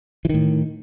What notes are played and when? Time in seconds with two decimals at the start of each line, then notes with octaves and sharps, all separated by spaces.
0.25 E3
0.29 D#3
0.34 A2